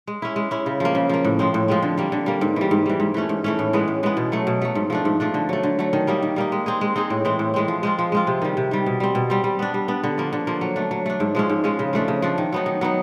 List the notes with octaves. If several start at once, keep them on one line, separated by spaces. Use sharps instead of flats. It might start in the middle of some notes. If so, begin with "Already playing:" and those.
G#3
C#4 E4
G#3
C#4 E4
C#3
F3 A#3
C#3
F3 A#3
A2
F3 G#3 C4
A2
F3 G#3 C4
D3
G3 A#3
D3
G3 A#3
G#2
E3 G3
G#2
E3 G3
G#2
E3 A3 C#4
G#2
E3 A3 C#4
A2
E3 G#3 B3
A2
E3 G#3 B3
B2
F#3 A3
B2
F#3 A3
G#2
F3 A3 D4
G#2
F3 A3 D4
D3
F#3 A3
D3
F#3 A3
D#3
G3 A#3 D#4
D#3
G3 A#3 D#4
G#3
C4 D#4 G#4
G#3
C4 D#4 G#4
A2
E3 G#3 C4
A2
E3 G#3 C4
F3
G#3 C4 F4
F3
G#3 C4 F4
C3
D#3 G3
C3
D#3 G3
B2
G3 C4
B2
G3 C4
G3
B3 D4
G3
B3 D4
D3
F3 A#3
D3
F3 A#3
F#3
A3 D4
F#3
A3 D4
G#2
F3 G#3 C#4
G#2
F3 G#3 C#4
C#3
F3 A3 D4
C#3
F3 A3 D4
D#3
F#3 B3 D#4
D#3
F#3 B3 D#4